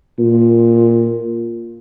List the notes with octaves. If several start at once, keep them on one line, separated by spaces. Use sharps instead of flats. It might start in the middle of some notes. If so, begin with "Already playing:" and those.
A#2